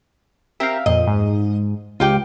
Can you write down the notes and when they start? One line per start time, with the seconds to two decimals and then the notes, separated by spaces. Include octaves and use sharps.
0.60 C4 G4 A#4 E5 F5
0.86 F2 A#2 D#5
1.07 G#2
2.00 C#2 F4 G4 G5